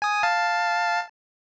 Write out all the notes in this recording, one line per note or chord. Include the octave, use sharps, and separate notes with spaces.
G#5 D#6
F5 A5